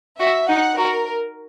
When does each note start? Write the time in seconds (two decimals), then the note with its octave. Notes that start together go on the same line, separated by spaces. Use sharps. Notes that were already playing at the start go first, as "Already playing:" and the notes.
0.20 F#4 E5
0.49 D#4 F#5
0.78 F#4 A#4